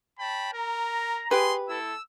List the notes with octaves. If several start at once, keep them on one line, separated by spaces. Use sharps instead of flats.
C#5 G5 A5 B5
A#4 A#5
G4 G#4 B4 C6
A3 E4 A4 E6